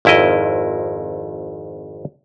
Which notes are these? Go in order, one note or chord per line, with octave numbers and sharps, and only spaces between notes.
G#1 F2 E4 A#4 D#5